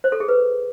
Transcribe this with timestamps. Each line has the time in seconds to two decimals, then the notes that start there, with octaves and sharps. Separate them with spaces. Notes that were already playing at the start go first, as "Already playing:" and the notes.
0.04 C5
0.12 A4
0.20 G#4
0.28 B4